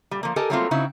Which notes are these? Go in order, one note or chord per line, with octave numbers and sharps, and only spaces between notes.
A#2 G3
F3 A#3
G4 A4 A#4 D#5 G#5 A5
F#3 G3 A3 A#3 C4 F4
C#3 C4 D#4 E4 F#4